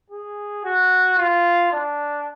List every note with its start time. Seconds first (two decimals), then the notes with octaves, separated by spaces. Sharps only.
0.10 G#4
0.64 F#4
1.18 F4
1.72 D4